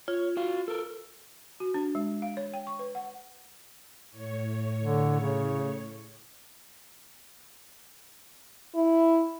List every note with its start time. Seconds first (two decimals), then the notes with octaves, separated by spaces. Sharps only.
0.08 F4 C#5
0.37 F#4 F5
0.68 A4 A#4
1.60 F#4
1.74 D4
1.95 G#3
2.22 F5
2.37 C#5
2.54 G5
2.67 C#6
2.79 B4
2.95 F#5
4.11 A2 C#5
4.81 D3
5.20 C#3
8.75 E4